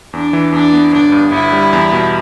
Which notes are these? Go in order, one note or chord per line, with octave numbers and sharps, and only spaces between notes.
E2 D4
E3
E2 D4
B3
G1 D4
G2
G1 E4
G3
E2
B2